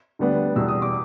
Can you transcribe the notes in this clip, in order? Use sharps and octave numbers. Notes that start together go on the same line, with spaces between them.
D2 D3 G3 B3 D4
E2 B2 G3 E6
D#6
D6